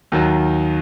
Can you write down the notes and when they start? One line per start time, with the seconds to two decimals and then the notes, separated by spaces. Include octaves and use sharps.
0.12 D#2 D#3 F#3